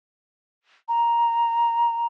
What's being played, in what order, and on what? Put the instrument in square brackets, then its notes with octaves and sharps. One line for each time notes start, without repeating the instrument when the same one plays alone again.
[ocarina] A#5